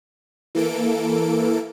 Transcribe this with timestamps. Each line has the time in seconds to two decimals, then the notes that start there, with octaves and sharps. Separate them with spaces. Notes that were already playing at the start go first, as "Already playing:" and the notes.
0.55 E3 A#3 A4 D7